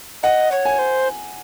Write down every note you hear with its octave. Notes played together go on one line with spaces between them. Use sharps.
D#5 F#5
C#5
G#5
C5